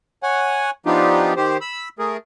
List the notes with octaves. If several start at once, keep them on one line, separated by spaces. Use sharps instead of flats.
C#5 F#5 G#5
F3 B3 D4 D#4 F4 G4
D#3 G4 C5
B5 E6
A3 G#4 A#4